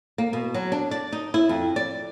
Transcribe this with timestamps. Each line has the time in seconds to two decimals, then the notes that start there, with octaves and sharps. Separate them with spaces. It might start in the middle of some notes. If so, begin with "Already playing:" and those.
0.18 A#3
0.33 B2
0.54 F#3
0.72 D4
0.91 D5
1.13 D#4
1.34 E4
1.49 F2
1.76 D5